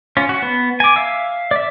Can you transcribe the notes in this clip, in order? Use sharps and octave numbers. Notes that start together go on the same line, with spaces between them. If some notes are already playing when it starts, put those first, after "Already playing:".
C#4 F4
F#4
B3
G#5 D6
E5 F5 E6
D5 E5